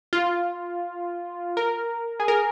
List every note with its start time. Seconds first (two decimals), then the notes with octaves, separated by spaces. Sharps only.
0.13 F4
1.57 A#4
2.20 G#4
2.28 A#4